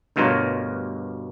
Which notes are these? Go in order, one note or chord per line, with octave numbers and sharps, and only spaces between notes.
D2 G2 B2 F4 A#4 C#5